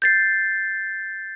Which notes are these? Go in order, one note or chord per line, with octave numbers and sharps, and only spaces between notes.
G6 A6 C7